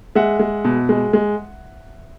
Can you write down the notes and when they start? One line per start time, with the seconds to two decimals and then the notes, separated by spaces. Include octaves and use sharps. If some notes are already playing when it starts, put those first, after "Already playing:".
0.15 G#3 E5 F#5
0.39 G#3
0.65 B2
0.89 G#3
1.13 G#3